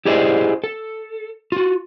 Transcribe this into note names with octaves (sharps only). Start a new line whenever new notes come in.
E4 G4 G#4 C5 D5 D#5
A4
F4 F#4